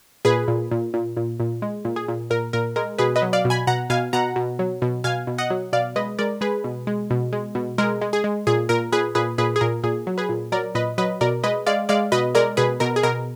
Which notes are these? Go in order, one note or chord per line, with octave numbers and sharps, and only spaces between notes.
A#2 G#4 B4
A#2
A#2
A#2
A#2
A#2
G#3
A#2
G#4
A#2
A#2 A#4
A#2 A#4
G#3 A#4
B2 G#4 B4
B4 D#5
F#3
D5 F5
B2
G#5 B5
B2 F#5 A#5
B2 F5 G#5
B2 F#5 A#5
B2
F#3
B2
B2 F5 G#5
B2
D#5 F#5
F#3
B2 D5 F5
G#3 B4 D#5
G#3 A#4 D5
G#3 G#4 B4
B2
G#3
B2
G#3
B2
G#3 A#4
G#3
G#4
G#3
A#2 G#4
A#2 A#4
A#2 G#4 B4
A#2 G#4 B4
A#2 G#4 B4
G#4
A#2 A#4
A#2 G#4
F#3
G#4 B4
A#2
F#3 A#4 D5
A#2 B4 D#5
F#3 B4 D#5
B2 A#4 D5
G#3 B4 D#5
G#3 D5 F5
G#3 D5 F5
B2 B4 D#5
G#3 A#4 D5
B2 G#4 B4
B2 A#4
G#4
B2 A#4